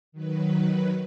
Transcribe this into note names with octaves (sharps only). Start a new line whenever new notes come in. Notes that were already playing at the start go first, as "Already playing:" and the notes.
D#3 F#3 B4